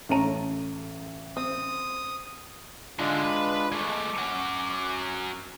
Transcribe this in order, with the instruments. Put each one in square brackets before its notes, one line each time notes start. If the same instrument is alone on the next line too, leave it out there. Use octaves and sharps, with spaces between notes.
[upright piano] A1 A5 D#7 [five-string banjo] A3 C#4 A#5
[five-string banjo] C4 [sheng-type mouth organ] D#6
[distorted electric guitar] G#2 D3 [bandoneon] G#3 D4 F4
[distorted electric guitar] B4 B5
[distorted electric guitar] G#3 A3 [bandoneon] D6
[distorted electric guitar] C#4 F#4